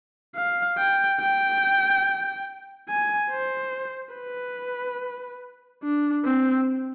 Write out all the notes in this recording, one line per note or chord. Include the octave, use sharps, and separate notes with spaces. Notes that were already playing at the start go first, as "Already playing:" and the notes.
F5
G5
G5
G#5
C5
B4
D4
C4